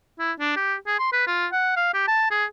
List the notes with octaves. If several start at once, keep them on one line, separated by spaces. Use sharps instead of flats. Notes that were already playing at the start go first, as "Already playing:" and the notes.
E4
D4
G4
G#4
C6
B4
F4
F#5
F5
G4
A5
G#4